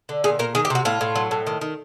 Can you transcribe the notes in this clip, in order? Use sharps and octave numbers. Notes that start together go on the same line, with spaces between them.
D3
A#2 G#4
A#2 A#4
D#3 G#4
G4
C3 F#4
A2 F4
A2
F#3
A2
D#3
D#3